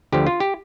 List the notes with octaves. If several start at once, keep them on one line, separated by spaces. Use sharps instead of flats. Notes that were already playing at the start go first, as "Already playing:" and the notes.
D2 D3 F3 G4
F4
G4